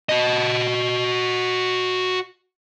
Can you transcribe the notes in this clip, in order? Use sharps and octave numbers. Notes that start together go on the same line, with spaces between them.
F#4 D#5